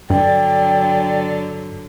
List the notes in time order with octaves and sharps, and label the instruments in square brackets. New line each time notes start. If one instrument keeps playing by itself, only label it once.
[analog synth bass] G2 [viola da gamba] D3 F#3 [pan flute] D5 [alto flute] G5